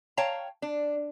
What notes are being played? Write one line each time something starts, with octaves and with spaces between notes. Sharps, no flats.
C#5 F5 G5 A5 A#5
D4